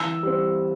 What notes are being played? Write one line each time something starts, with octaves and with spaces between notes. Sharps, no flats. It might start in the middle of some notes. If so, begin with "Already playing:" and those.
Already playing: E3 E6
G3 C4